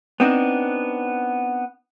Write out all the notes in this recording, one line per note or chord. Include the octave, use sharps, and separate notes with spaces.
B3 C4 D4 D#4